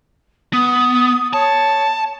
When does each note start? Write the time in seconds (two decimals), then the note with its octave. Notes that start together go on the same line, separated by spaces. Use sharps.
0.53 B3 D#6
1.33 C#5 A5